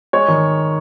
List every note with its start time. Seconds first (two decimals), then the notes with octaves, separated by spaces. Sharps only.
0.13 G#3 C#5
0.28 D#3